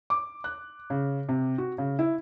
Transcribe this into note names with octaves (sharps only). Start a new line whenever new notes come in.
D6
F#6
C#3
C3
F#4
C#3
E4